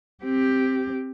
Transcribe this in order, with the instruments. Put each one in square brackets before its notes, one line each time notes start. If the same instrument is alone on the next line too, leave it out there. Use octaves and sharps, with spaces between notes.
[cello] C4 G4